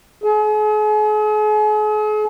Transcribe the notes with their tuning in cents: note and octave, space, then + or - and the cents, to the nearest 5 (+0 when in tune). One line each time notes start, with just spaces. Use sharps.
G#4 +40